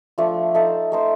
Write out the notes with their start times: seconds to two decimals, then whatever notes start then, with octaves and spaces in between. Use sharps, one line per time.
0.18 F3 A3 D4 F4
0.55 A3 D#4 A4 C5
0.92 A3 D#4 A4 C5